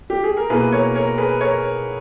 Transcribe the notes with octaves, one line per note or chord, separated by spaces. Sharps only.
G4
G#4
A#4
B2 A#3 E4 G#4 B4
A#4 C#5
A#4 C#5
G#4 B4
A#4 C#5